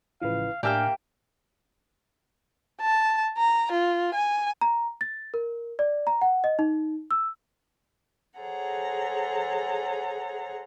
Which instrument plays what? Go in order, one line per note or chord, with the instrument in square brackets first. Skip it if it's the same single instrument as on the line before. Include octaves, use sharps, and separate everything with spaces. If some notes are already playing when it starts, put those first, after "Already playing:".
[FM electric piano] A1 C#3 F3 [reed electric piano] E4 B4 [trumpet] F5
[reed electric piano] A2 G#5 F6 [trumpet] A#3 [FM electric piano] D4 [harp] G4 E5 G5
[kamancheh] A5
A#5
F4
G#5
[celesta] A#5
A6
A#4
D5
A#5
F#5
D#5
D#4
E6
[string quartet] G#4 A4 C5 C#5 F#5 A#5